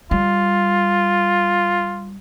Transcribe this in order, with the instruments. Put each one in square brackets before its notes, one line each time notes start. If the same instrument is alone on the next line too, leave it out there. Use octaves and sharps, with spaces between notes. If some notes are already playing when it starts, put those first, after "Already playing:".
[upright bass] G3 [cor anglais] F4